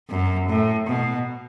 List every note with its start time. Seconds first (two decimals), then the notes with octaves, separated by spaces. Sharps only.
0.10 F#2
0.49 A2
0.87 B2